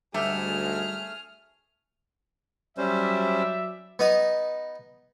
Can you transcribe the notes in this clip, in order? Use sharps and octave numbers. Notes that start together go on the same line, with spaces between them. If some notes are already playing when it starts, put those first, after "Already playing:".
D2 G#2 G3 A3 G4 G#4 F6
F#3 G3 C#4 C5 D5 E5
B3 D#4 D#6